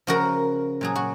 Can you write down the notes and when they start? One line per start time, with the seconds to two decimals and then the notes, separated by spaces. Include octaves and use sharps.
0.07 C#3 F3 F#4 A#4
0.81 A#2 F#3 G#4
0.95 F#4